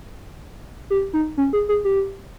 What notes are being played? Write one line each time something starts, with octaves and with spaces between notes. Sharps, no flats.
G4
D#4
C#4
G#4
G#4
G4